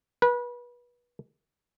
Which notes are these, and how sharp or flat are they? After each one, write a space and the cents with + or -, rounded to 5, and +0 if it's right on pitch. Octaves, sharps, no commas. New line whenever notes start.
B4 -30